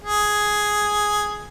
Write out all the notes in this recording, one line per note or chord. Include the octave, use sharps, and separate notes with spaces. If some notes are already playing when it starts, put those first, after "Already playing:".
G#4